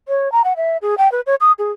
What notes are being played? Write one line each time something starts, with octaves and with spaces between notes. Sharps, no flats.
C#5
A#5
F#5
E5
G#4
G5
B4
C#5
D#6
G#4